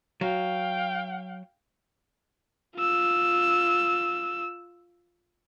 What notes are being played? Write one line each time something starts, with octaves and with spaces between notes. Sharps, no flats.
F#3 F5 G5
F4 E6